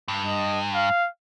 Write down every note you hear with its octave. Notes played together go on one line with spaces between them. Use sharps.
G2
D#5
F5